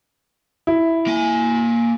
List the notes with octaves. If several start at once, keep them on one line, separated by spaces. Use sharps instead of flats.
E4
A#3 G#5